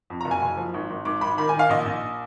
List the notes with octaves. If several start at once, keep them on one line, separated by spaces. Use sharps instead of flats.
F2
A#5
F#1
G#5
F#1
F3
G#1
G#1
G#1 D6
G#1 B5
D#3 B5
G#5
D#3
F5
A#1 D#5
A#1